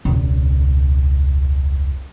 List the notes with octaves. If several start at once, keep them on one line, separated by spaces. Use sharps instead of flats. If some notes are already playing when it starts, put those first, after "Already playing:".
E1 C#2